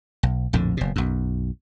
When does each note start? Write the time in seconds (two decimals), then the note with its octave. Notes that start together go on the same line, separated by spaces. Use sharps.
0.23 B1
0.53 A#1 F2 A2 D3
0.77 F#1 B2
0.96 B1 F#2